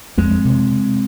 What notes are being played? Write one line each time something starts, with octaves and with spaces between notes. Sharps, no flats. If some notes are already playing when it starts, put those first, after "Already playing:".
F2 G#3 C4
C3